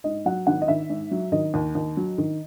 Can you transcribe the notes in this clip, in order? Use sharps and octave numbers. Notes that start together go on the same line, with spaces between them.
G#2 D#5
F#3 F#5
G#1 F#5
D#5
D#3 E5
G#2
F#3
D#3 D#5
D#2
D#2
F#3
D#3